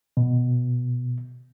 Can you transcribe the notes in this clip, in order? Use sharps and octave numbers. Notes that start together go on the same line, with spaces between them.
B2